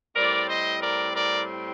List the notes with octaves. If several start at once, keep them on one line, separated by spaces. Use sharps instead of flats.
A2 G3 C4 A#4 D5
C5 D#5
A#4 D5
A#4 D5